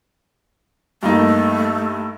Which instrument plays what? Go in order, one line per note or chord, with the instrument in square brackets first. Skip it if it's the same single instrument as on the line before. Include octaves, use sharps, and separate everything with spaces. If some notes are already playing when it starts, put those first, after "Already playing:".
[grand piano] G2 A#3 D#4 [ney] A3